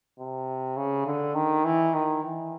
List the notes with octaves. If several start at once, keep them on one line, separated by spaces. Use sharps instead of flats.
C3
C#3
D3
D#3
E3
D#3
E3